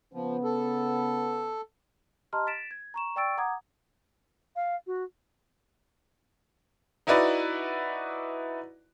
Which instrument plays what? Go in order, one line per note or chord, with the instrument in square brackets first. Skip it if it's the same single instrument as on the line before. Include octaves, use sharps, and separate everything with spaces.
[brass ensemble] C#3 B3 [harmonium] F3
[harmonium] A4
[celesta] G4 D#5 A5 A#5 C6 F6
A6 B6 D7 E7
G#6
A#5 C#6 E7
D5 G5 C#6 E6 A6 D7
F#5 A#5 D6 D#6 G#6
[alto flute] F5
F#4
[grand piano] D#4 E4 F#4 B4 D5